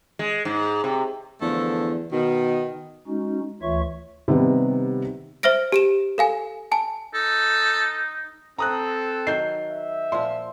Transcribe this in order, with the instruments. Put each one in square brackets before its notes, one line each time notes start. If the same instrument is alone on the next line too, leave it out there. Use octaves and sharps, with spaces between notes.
[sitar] G#3
G#2
C3
[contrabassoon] E2 [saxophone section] D3 F3 A3
[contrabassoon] B2 [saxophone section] D#3
[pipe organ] G#3 C#4 D#4 F#4
D2 E3 F4 C#5 E5 C#6
[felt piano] C3 D#3 G3 B3
[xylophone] C5 E5 F6 A#6 D7
G4 D7 E7
A4 F5 G#5
G#5 A5
[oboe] D#4 [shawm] A4
[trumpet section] C4 A4 [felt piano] A#5 D#6 F#6
[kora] D#3 F#3 [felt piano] G6 C7
[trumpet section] E5
[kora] A#2 F3 [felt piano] C6